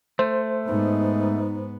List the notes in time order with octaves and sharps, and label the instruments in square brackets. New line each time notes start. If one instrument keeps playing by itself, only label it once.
[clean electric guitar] A3 [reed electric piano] C5
[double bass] G#2 B3 [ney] D#4